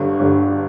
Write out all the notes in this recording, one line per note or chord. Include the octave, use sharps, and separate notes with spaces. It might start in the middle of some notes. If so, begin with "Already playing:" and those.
Already playing: G1 G2 D3
G1 G2 D3